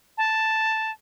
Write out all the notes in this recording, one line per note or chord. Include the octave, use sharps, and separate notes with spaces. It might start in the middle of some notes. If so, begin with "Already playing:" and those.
A5